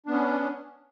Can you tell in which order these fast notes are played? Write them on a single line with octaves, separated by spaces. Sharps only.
D4 B3 C#4